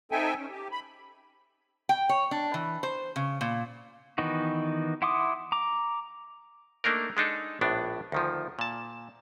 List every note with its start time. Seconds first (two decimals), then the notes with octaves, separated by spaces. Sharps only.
0.12 C4 D#4 A4 E5 G5 G#5
0.39 C#4
0.50 G4
0.72 B5
1.89 G5
2.09 C#5
2.31 D4
2.54 E3
2.83 C5
3.16 C#3
3.41 A#2
4.18 D#3 E3 B3 D#4 F#4
5.02 E4 F#5 C6 D6 D#6
5.52 A#5 D6
6.84 A3 A#3 D4 D#4 A#4
7.17 G#3 D4 D#4 A4
7.61 A#1 A2 B3 D4
8.12 D2 D#3 F3
8.59 A#2 A5